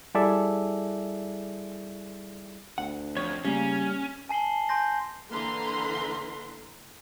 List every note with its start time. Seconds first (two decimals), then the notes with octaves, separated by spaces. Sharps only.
0.15 G3 E4 G#4 A4 D5 E5
2.78 D2 F#5
3.17 F2 C#5
3.45 C#3 G3 A#3 C#4
4.29 G#5 A5 C7 F#7 G7
4.69 G#5 C6 G6 A#6
5.32 D3 E3 A#3 B4 A#5 C6